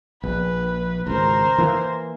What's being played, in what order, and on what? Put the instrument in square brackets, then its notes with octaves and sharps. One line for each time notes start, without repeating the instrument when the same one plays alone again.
[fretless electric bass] A#1 [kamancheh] B4
[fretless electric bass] G#1 C#2 [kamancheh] A#4 C5
[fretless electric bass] E3 A#3